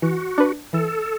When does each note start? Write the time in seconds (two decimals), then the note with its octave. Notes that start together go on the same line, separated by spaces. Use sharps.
0.02 E3 F#4
0.38 D4 B4
0.73 E3 A4